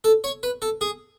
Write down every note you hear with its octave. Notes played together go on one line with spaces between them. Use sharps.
A4
C#5
B4
A4
G#4